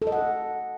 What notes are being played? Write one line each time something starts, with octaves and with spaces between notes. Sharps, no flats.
A4
D#5
F#5